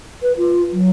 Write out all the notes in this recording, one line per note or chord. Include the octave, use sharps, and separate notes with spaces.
B4
F4
F#3